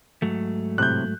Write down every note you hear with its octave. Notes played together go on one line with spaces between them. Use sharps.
G#2 F#3 A3
A2 C3 F#6 G6